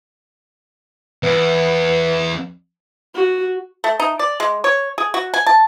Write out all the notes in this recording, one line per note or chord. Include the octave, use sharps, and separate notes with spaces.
E2 B3
F#4
A3
D#4
D5
G#3
C#5
G#4
F#4
G#5
A5